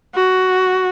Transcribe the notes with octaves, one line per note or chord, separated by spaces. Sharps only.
F#4